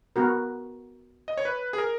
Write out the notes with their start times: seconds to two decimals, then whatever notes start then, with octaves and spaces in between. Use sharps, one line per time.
0.16 B3 F#4 A#4
1.28 D#5
1.37 C#5
1.45 B4
1.73 G#4
1.78 A#4